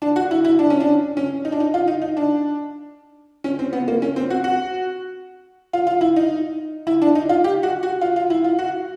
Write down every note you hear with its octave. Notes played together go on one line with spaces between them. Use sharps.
D4
F#4
E4
E4
D4
C#4
D4
C#4
D#4
D4
D#4
F4
D#4
D#4
D4
C#4
C4
B3
A#3
C#4
C4
F#4
F#4
F4
F4
E4
D#4
E4
D4
D#4
F4
G4
F#4
F#4
F4
F4
E4
F4
F#4